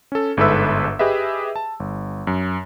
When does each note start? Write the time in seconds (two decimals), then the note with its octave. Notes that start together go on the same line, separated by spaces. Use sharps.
0.12 C#4 A4
0.37 G1 G#2 A4 B4 E5 E6
0.99 G4 G#4 B4 D#5 E5
1.56 A5
1.80 G1
2.27 F#2